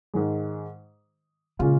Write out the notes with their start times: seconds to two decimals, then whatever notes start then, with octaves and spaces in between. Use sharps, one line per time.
0.14 G#2 D#3 G#3
1.59 A#2 C#3 G#3 C#4 F4